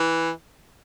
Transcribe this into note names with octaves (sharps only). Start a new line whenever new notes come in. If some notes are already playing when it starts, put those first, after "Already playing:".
Already playing: E3